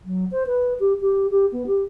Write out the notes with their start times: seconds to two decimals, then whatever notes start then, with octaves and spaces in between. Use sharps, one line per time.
0.05 F#3
0.31 C5
0.47 B4
0.80 G4
1.01 G4
1.30 G4
1.52 B3
1.67 G4